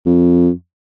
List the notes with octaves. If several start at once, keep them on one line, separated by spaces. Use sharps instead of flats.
F2